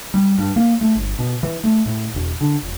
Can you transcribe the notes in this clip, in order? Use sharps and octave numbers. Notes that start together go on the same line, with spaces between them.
G3
G2
A#3
A3
G1
B2
E3
A3
A2
E1
D3
F1